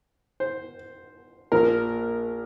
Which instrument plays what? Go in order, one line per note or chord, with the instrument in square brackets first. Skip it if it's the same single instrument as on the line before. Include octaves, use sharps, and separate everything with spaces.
[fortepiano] C5
A#1 A#2 F3 A#4